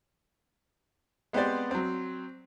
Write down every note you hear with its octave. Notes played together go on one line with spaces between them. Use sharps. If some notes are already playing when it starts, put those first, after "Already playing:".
G#3 B3 C4 G4 C5 D5
F#3 C4